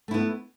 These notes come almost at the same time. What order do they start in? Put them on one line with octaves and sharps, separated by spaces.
A3 E4 B3